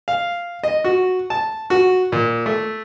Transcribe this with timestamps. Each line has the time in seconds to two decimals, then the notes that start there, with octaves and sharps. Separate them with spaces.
0.08 F5
0.63 D#5
0.84 F#4
1.30 A5
1.70 F#4
2.12 A#2
2.46 A3